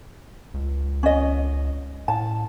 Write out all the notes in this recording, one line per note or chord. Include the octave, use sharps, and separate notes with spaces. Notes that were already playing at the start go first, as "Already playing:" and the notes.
C#2
C#4 D#5
A2 A5